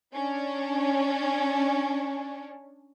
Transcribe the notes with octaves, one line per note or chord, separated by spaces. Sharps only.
C#4 D4